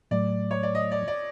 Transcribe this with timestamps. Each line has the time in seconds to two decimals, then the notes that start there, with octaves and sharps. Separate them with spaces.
0.11 A2 F#3 A3 D5
0.51 C#5
0.63 D5
0.75 D#5
0.92 D5
1.08 D5